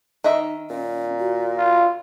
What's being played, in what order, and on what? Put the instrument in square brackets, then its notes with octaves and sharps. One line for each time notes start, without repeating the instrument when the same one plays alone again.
[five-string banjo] D#3 D#5 E5 [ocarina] D#4
[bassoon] A#2 [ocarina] C#4
[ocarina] F#4
[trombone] F4